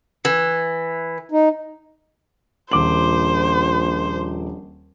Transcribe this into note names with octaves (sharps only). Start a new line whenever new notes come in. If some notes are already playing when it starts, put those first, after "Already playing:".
E3
D#4
D#1 A#1 C5 D6 F#7